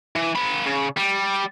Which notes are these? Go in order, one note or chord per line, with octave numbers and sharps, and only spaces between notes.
E3
A#3 B5
C#3
G3